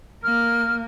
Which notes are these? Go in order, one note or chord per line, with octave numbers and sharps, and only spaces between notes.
A#3 F6